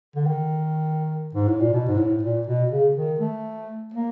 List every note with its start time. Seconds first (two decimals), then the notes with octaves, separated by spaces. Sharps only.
0.16 D3
0.26 D#3
1.35 G#2
1.48 A2
1.61 A#2
1.73 B2
1.88 G#2
1.97 A2
2.23 A#2
2.47 B2
2.71 C#3
2.96 D#3
3.20 A3
3.94 A#3